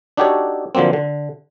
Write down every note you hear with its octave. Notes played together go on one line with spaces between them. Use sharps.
D4 D#4 F#4 G4 A4 C#5
D3 F3 F#3 A#3 C4
D3